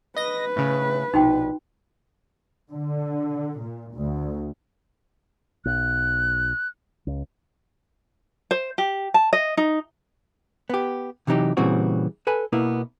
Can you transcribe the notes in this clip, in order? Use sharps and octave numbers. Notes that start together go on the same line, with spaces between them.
B4 D#5 A#6
A2 C#3
A#1 B2 D#4 F#4 G5
D3
A#2
D2
B1 F#6
C#2
C5
G4
A5
D#5
D#4
B3 G4
C3 E3 F#3 D#4 G4
A#2 C#3 E3 G3 C4 F#4
A4 B4 G#5 B5
B2 A#3 B3 E4